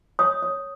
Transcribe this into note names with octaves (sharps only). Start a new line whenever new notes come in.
C#5 D#6
C#5